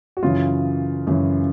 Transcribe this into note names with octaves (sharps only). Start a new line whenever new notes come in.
F#4
F#2 C#3 E3 F4
F#2 C#3 E3